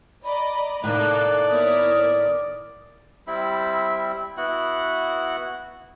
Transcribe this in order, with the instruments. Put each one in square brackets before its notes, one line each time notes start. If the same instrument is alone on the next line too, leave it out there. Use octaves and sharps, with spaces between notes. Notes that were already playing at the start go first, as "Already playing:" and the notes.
[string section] D5 D#5 [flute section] A#5 B5
[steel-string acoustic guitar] A2 D#3 [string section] C3 A#3 A4 [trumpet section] D5 [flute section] F#6
[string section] B3 E4 C#5 [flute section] A#4 D#6
[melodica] G3 C4 E4 B5
B3 E4 F#4 F#5